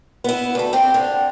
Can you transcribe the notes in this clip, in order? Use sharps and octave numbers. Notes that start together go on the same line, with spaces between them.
B3 E4
D2 A4
C4 G4
D3